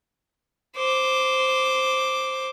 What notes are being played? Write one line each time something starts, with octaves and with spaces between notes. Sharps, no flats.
C5 D6